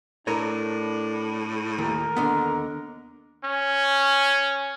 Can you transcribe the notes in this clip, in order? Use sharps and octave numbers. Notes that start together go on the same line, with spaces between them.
A2 D4 A#4 C#5
D#2 A#4
D#2 D3 B3
C#4